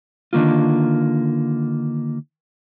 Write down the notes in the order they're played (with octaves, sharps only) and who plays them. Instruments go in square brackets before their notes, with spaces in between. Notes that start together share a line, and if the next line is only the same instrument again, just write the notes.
[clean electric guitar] D3 D#3 A#3 F4